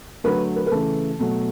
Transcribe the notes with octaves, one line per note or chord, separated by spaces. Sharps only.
D3 F#3 A3 B4
B4
B4
C#3 E3 A3 A4
B2 F#3 A3